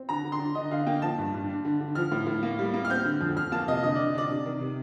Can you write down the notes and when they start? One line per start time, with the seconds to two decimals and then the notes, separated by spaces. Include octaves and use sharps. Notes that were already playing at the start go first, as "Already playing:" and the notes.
Already playing: C4
0.09 D3 A#5
0.25 D3
0.32 C6
0.39 D4
0.55 D3 D#5
0.71 D3 F5
0.86 A#3 G5
1.02 F3 A5
1.18 G2
1.34 G2
1.50 D4
1.65 D3
1.80 D3
1.95 F3 F6
2.12 A2
2.27 A2
2.43 A#3
2.59 G3
2.74 A#3
2.85 F6
2.90 C4 G6
3.05 D3
3.21 F2
3.36 F2 F6
3.52 A#3 A5
3.68 C3 D#5
3.83 D3 D#5
3.95 D3 D5
4.14 D4 D5
4.30 C3
4.45 D#3
4.60 C3